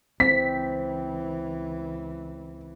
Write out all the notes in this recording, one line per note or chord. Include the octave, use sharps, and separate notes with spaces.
C#2 E3 C4 B6